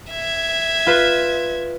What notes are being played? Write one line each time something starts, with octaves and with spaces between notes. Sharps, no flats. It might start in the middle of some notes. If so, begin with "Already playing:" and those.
E5 G#6
F4 B4 E7